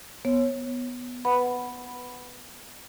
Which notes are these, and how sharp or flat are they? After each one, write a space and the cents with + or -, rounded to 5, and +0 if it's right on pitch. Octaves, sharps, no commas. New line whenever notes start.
B3 +0 C#5 -20
B4 +0 F#5 +0 B5 +0